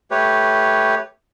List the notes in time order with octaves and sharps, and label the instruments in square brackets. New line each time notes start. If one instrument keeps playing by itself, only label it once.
[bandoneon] A3 G4 B4 C#5